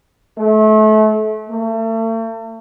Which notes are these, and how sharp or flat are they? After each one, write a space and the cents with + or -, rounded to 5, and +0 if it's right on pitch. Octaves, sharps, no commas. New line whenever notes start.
A3 -30
A3 +40